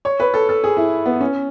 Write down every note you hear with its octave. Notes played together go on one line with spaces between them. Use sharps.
C#5
B4
A4
A4
G#4
E4
B3
C#4